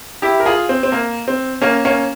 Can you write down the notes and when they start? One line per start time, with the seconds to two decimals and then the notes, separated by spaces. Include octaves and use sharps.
0.22 E4 G4
0.40 A#4
0.46 F4 G#4
0.69 C4
0.83 C4
0.92 A#3
1.28 C4
1.62 A#3 C#4
1.85 A#3 C#4